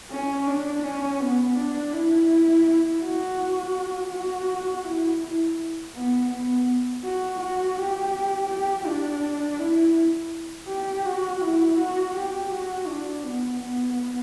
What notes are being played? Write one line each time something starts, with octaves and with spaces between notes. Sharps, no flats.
C#4
D4
C#4
B3
D4
E4
F#4
F#4
E4
E4
B3
B3
F#4
F#4
G4
G4
D4
E4
G4
F#4
E4
F#4
G4
F#4
D4
B3
B3